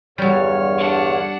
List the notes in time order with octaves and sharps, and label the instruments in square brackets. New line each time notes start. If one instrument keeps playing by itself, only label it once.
[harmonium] E2 G2 D3 [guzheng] F#3 G3 [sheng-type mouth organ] C#5 F6
[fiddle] D4 F#5